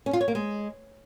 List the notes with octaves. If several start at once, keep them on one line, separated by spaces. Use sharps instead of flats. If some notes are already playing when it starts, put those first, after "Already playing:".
C#4
F4
C#5
A#3
G#3